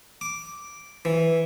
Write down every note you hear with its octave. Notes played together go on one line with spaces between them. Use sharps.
D6
E3